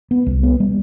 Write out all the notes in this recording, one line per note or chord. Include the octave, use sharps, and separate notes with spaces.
B3
C2
B3
G3